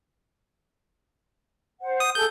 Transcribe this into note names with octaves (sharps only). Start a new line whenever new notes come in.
C5 F#5
D#6
G#4 A4 G6